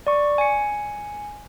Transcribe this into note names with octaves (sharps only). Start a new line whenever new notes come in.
D5 C#6
G#5 C#7